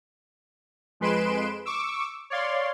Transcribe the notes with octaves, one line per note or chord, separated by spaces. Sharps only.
F2 G#3 B4 C6 D7 E7
C#6 D6 E6
C#5 D5 F5 C6